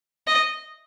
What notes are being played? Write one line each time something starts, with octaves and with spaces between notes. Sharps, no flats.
D#5